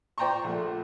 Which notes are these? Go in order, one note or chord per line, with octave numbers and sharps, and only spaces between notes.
C5 D5 G5 A#5 C6 C#6
A#1 A3